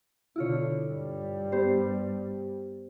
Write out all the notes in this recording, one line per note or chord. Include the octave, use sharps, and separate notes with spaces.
B2 D3 E4 F4 C#5
G2 G3
B3 G4 C5